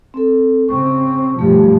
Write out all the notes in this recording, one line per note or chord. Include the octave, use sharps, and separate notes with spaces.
C4 A4
C#3 C4 C#6
G2 B2 F3 A3 G4